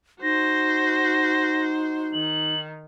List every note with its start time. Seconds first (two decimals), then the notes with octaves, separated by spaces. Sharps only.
0.22 D#4 F#4 C5 A#6
2.13 D#3 F#7